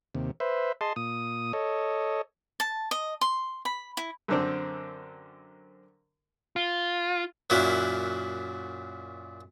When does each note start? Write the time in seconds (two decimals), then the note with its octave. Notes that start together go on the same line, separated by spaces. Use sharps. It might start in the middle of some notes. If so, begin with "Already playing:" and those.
0.15 D#2 C3
0.40 B4 C5 E5
0.81 G#4 D#5 A5 C6
0.96 A#2 D#6
1.53 A4 C#5 D#5
2.60 A5
2.91 D#5
3.21 C6
3.65 B5
3.97 E4
4.28 F#2 D3 C4
6.56 F4
7.50 F#2 A#2 F#3 E4